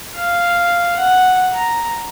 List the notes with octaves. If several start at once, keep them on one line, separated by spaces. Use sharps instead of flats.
F5
F#5
A#5